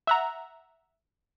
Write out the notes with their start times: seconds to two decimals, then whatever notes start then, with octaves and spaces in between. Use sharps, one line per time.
0.07 E5 F#5 A#5